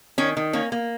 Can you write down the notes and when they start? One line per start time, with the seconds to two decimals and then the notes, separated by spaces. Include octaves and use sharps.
0.18 D#3 C#4
0.37 D#3
0.53 A#3 C#4
0.72 A#3